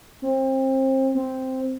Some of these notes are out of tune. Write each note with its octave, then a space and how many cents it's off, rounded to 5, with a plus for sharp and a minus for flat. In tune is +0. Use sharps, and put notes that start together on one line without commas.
C4 +30
C4 -5